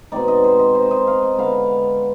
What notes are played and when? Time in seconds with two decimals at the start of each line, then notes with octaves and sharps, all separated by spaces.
0.12 B2 G#3 C4 D#4 D5
0.28 D#5
0.44 C5
0.59 D#5
0.75 C5
0.91 D#5
1.07 F5
1.22 D#5
1.38 D3 G#3 B3 F5